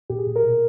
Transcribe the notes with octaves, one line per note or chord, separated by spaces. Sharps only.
A#2 G4
G#4
A#2
A#4
B2